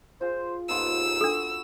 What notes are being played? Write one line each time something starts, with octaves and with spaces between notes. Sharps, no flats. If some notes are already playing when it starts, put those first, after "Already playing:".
F4 G#4 C5
D#2 G#2 B3 F4 A4 E6
D4 F#4 A4 C#6